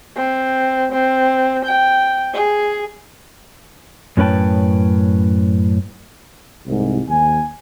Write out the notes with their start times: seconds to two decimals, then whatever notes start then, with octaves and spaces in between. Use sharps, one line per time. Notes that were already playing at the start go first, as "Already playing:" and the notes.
0.16 C4
0.92 C4
1.65 G5
2.33 G#4
4.17 F#2 A2 C#4 B4 G5 A5
6.65 C2 G#2
7.08 D#2 G#5